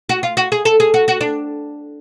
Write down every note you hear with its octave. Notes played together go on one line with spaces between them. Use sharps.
F#4
F4
F#4
G#4
A4
G#4
F#4
F#4
D4